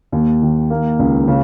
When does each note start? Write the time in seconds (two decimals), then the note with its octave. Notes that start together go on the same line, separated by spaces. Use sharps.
0.12 D#2
0.42 D#3
0.70 A#3
0.99 C#2
1.28 C#3